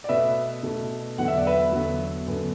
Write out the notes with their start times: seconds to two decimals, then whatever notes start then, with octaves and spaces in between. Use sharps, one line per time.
0.04 D5
0.09 B2 A3 B4 E5
0.63 B2 A3
1.18 E2 D3 F#3 B3 F#5
1.28 E5
1.37 D5
1.47 B4 E5
1.72 E2 D3 F#3 B3
2.27 F#2 D3 B3